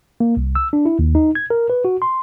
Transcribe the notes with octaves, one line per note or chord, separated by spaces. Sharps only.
A#3
C2
E6
D4
E4
D#2
D#4
G#6
A#4
B4
F#4
C6